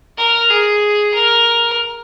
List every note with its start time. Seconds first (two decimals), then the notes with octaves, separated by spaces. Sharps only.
0.18 A#4
0.50 G#4
1.15 A#4